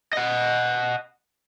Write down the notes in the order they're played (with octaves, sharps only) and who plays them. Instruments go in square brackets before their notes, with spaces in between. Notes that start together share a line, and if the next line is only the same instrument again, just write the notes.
[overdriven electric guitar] D#5 F#5